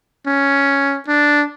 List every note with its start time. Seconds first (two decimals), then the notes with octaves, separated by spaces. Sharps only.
0.26 C#4
1.07 D4